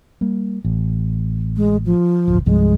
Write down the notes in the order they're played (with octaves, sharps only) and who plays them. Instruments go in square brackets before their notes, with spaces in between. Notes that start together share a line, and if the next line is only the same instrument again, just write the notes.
[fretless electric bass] G3 A#3
A1
[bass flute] G#3
F3
[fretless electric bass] D1 G1
[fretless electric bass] C2 G2 F3 [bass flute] G#3